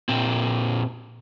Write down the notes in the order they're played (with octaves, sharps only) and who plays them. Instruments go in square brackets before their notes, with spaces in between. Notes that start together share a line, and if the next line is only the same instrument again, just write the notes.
[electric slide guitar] A#2 C4